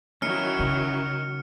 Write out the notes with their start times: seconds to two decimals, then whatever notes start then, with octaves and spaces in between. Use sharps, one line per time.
0.22 D#3 F#3 C#4 D#4 E4 F6 C#7
0.59 C#3